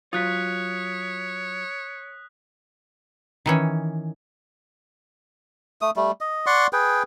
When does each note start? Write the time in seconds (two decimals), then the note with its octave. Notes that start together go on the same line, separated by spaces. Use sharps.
0.13 F#3 F4 C#5 D#6 F#6 B6
3.46 D#3 E3 C#4
5.82 A3 D#6
5.96 G3 A3
6.21 D#5
6.46 D5 F#5 C6 C#6
6.73 G#4 B4 G5